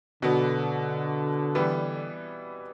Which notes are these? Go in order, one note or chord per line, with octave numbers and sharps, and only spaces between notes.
B2 D3 F#3 B3 F#4
E3 G3 B3